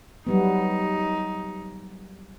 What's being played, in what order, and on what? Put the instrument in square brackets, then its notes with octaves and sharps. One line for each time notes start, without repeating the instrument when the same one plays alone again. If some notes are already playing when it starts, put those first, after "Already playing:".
[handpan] F#3 G3 B3 [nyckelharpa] D#4